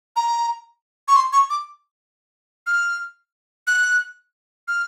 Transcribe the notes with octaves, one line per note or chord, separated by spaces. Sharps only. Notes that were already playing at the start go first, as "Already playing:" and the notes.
A#5
C#6
C6
C#6
D6
F6
F#6
F6